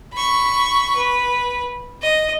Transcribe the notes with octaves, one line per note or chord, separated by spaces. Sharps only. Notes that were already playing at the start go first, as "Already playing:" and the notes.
B5 C#6
B4
D#5